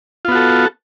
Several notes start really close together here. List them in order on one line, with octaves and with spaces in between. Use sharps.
F4 B3 F#4 A4